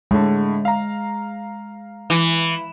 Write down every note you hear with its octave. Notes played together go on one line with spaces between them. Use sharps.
A2 D3 G#3
F5 A#5
E3